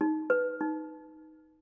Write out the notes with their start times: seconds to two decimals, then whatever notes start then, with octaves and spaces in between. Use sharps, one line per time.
0.01 D#4
0.30 B4
0.61 D#4